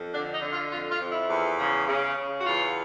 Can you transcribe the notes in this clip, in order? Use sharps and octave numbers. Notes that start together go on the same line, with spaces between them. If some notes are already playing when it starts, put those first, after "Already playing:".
Already playing: F2
D3 D4
D#4
D3
F4
F2 F4
F4
F2
E4
E2
C#3
C#3
C#3
F#4
E2 F4